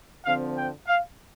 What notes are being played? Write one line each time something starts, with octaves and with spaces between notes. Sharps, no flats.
D3 F3 C4 F5
G5
F5